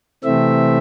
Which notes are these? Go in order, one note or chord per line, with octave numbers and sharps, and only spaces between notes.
C3 E3 A3 C4 E5